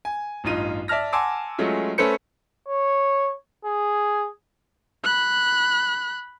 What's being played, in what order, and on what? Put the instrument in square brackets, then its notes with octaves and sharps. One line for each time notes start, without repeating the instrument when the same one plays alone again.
[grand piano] G#5
A1 G2 D#4 F4 D#7
D5 E5 A5 F6 A#6
F#5 G#5 A5 C6 D6 E6
F#3 G#3 A3 C#4 F4
A3 C#4 A4 B4 C5 C#7
[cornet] C#5
G#4
[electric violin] B5 F#6